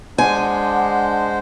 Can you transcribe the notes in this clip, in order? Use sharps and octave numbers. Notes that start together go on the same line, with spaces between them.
G#3 D4 C5 F#5 G#5